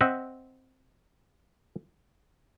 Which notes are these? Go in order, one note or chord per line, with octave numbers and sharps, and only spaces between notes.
C4 D#5 E5 F#5